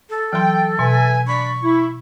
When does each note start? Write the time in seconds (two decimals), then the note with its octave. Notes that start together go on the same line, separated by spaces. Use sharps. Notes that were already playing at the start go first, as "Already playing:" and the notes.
0.10 A4
0.33 E3 F#3 G5 C6
0.79 B2 B4 E5 G#5
1.27 D4 D5 B5 C#6
1.63 E4